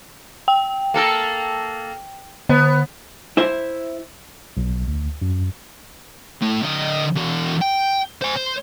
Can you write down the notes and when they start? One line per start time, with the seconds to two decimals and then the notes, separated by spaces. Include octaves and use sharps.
0.48 G5
0.94 A#3 A4 A#4
2.49 D3 B3
3.37 E4 C5 E5
4.57 B1
4.88 D2
5.22 F#2
6.41 A3 E4
6.63 D3 D#5
7.15 E2 F#4
7.61 G5
8.21 C5 G#5
8.36 C5